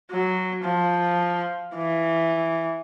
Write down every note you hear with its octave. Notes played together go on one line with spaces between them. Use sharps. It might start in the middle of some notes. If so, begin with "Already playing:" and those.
F#3
F3
E3